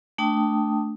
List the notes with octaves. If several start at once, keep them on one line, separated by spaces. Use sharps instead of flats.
A3 D4 G5 A5 D#6